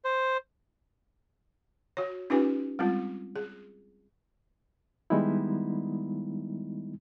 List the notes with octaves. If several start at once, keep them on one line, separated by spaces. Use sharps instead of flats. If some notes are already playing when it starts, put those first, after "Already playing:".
C5
F#4 C#5
C#4 D#4 F4 G4 B4 G#5
G3 G#3 C4 F4
G#4
D#3 G3 G#3 B3 D#4 E4